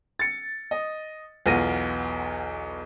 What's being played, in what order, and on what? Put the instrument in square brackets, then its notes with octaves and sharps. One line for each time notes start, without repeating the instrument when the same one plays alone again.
[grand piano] A6 C#7
D#5
B1 E2 B3 F4 A#6 D#7